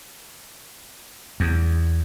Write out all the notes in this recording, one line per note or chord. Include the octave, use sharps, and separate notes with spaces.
E2